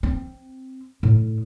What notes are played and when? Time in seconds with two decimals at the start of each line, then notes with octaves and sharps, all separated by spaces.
0.03 C4
1.03 A2